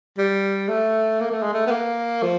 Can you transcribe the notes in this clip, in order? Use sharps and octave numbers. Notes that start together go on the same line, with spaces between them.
G3
A3
A#3
A3
G#3
A3
B3
A#3
F3